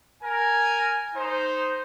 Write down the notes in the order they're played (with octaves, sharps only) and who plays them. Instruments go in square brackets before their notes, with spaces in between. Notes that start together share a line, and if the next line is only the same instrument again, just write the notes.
[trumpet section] A#4 G#5
D#4 C5